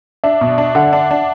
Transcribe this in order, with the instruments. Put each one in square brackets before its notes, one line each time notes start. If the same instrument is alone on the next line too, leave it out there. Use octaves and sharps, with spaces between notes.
[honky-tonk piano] D4 [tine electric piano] E5
[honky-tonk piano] B2
D4
[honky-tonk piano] D3 [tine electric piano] F#5
[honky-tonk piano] D4
D4